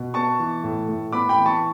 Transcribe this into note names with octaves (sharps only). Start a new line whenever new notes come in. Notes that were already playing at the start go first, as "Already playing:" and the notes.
Already playing: B2
B3 A5 C#6
E3
A2
A2
B3 B5 D6
G5 B5
E3
A5 C#6